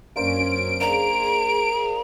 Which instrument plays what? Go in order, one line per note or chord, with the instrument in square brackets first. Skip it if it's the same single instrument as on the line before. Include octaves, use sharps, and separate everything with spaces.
[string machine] F#2 C#4 [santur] A#3 D4 C5 [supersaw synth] D7
[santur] A#3 D4 C5 [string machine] G#4 [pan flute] A#5